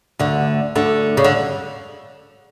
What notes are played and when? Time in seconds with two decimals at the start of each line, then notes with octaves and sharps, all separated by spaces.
0.19 D2 D3
0.75 D2 D3
1.17 C#3
1.24 D3